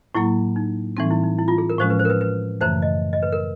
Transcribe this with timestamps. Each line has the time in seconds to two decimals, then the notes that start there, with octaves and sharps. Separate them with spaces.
0.15 A2 F#3 A#3 E4
0.56 D#4
0.97 A2 E3 G3 C4 D#4
1.11 E4
1.23 D#4
1.39 E4
1.48 F4
1.58 G#4
1.70 A#4
1.79 A2 F3 G#3 C#4 C5
1.90 B4
1.99 C5
2.05 A#4
2.10 B4
2.21 B4
2.61 F#2 C#3 E3 A3 C5
2.82 D#5
3.13 D#5
3.23 B4
3.32 A#4